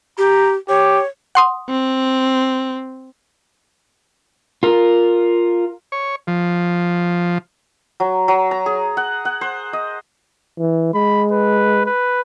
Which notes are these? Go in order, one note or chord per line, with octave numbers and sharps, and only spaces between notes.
G4 A#5
G4 C#5
F#5 C6 D#6
C4
F4 A#4
C#5
F3
F#3
F#3
A#5
G#4
F#5
F#5
C5
D#5
E3
G#3 B5
B4
B4